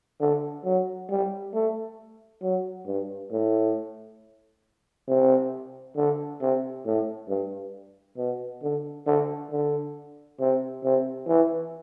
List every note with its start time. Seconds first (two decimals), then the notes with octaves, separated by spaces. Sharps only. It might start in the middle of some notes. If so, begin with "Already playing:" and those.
0.20 D3
0.65 F#3
1.10 G3
1.54 A3
2.43 F#3
2.87 G2
3.32 A2
5.08 C3
5.97 D3
6.41 C3
6.86 A2
7.29 G2
8.18 B2
8.63 D3
9.07 D3
9.51 D3
10.40 C3
10.84 C3
11.28 E3